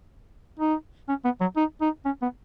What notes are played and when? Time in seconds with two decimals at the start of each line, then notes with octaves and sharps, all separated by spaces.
0.60 D#4
1.09 C#4
1.25 B3
1.41 F#3
1.57 D#4
1.82 D#4
2.06 C#4
2.22 B3